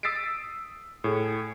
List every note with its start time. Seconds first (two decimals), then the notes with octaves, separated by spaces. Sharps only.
0.03 D#6 E6 A6 B6 C7 D7
1.04 A2 G#4